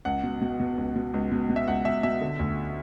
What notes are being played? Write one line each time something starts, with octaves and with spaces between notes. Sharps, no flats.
C#2 F#5
B2
B2
B2
C#2
B2
C#2
B2
B2
E5
C#2 F#5
B2 E5
B2 E5
D3
D2